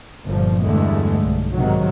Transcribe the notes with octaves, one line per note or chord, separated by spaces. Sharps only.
G1 A#2 F3
E2 G2 D3 G#3 A3
B1
G#2 C3 D#3 F#3